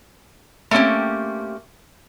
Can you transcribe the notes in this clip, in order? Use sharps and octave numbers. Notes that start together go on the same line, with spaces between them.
A3 A#3 C4 C#4 G4